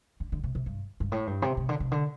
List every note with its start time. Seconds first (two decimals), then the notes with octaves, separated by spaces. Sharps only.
0.20 D3
0.32 D3
0.44 C3
0.55 C3
0.66 G2
1.00 G2
1.12 A2
1.27 G2
1.42 C3
1.57 C3
1.69 D3
1.80 C3
1.92 D3